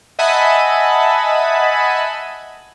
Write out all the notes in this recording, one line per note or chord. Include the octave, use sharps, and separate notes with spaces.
D#5 E5 F#5 G#5 A5 B5